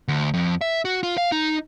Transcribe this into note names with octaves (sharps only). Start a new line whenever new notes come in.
D2
F2
E5
F#4
F4
F5
D#4